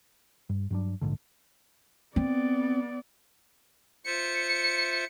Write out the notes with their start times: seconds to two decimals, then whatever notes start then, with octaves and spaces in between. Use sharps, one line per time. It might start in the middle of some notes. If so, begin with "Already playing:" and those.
0.49 G2
0.71 G2 F#3 D4
1.01 A#1 G#2 D3
2.16 B3 C4 D5
4.06 F4 C5 E5 C#7